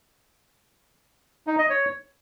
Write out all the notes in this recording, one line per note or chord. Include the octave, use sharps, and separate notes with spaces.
D#4
D#5
C#5